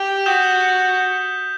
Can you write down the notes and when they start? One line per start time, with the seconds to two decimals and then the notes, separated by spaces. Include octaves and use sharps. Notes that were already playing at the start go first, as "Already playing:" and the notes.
Already playing: G4
0.26 F#4 D#6 G6 B6 E7 G7